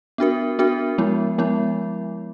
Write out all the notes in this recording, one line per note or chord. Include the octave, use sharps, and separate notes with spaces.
B3 D4 F#4 A#4
B3 D4 F#4 A#4
F3 G#3 B3 E4
F3 G#3 B3 E4